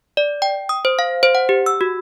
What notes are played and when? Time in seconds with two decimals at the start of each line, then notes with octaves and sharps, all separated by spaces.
0.17 D5
0.42 G5
0.69 D#6
0.85 C5
0.99 F5
1.23 C5
1.35 F#5
1.49 G4
1.66 E6
1.81 F#4